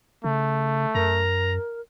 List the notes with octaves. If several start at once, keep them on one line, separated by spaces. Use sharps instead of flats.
C#3 A3
F#2 A#4 A#5